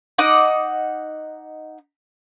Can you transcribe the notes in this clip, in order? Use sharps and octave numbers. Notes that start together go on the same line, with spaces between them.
D#4 D#5 F#5 D6